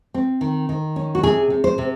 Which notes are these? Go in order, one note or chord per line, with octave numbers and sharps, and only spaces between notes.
C4
D#3
D#3
C#4
F#4
C3 G#4
C3
C5
C3